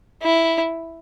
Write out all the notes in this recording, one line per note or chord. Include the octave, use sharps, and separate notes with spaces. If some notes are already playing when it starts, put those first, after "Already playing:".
E4